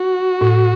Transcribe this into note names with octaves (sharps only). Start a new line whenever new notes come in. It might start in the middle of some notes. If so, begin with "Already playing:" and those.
Already playing: F#4
A2